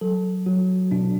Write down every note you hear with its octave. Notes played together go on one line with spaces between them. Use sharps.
F#3 A4
F#3 F#4
B2 D4